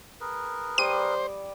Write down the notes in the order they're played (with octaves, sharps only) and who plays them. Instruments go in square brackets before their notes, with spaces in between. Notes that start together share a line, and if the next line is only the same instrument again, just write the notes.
[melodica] G#4 A#4 B4
[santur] G3 D5 D#6 [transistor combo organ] C5 [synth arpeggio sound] D#7